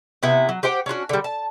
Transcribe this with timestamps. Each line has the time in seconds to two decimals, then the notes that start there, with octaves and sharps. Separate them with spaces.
0.23 C3 B3 E4
0.49 F#3
0.63 G4 C5 F#5 G5
0.86 C#4 D4 F4 F#4
1.09 D3 G3
1.24 A5